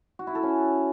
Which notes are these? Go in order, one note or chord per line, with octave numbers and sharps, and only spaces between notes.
F#4
E4
A4
C#4